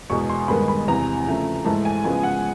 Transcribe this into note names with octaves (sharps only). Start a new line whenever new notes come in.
E2 B2 G#3 C#6
C6
G2 D#3 G#3 B3 B5
B5
E2 C3 E3 A#5
C#3 F3 A3
G#2 E3 A3 A5
G#5
C#3 F3 G#3 B3 G#5
F#5